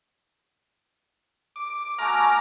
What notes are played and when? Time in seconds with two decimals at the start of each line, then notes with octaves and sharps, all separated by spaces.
1.56 D6
1.99 A3 F#4 G#5 A#5 D6 F6